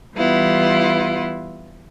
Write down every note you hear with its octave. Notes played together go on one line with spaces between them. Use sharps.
E3 G3 B3 E4 F4